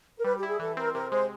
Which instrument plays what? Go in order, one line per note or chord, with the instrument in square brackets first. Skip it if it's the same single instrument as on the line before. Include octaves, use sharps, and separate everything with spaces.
[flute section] A#4
[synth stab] G3 [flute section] B4
[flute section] G4
[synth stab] E4
[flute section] G#4
[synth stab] E3 [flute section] A4
[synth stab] C4 [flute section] A#4
[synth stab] C3 [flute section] A#4
[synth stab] G#3 [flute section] C5